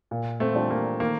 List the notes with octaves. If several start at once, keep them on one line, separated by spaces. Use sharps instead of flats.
A#2
A3 C4
G3 D4 F4 A4
A#3
D#3 A#3